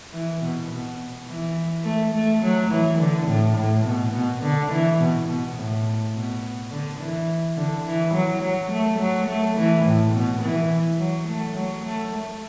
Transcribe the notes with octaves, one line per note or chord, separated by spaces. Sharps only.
E3
B2
B2
E3
A3
A3
F#3
E3
D3
A2
A2
B2
B2
D3
E3
B2
B2
A2
B2
D3
E3
D3
E3
F#3
F#3
A3
F#3
A3
E3
A2
B2
E3
F#3
A3
F#3
A3
A3